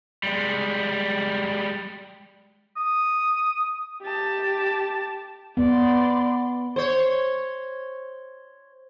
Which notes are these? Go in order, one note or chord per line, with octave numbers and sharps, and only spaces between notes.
G3 G#3
D#6
G4 A5
B3 D5 C6
C5 C#5